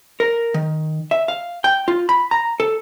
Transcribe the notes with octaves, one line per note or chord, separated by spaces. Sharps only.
A#4
D#3
E5
F5
G5
F4
B5
A#5
A4